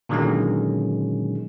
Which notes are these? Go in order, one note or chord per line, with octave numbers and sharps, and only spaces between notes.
A#2 D3 D#3 F#3 G#3 C#4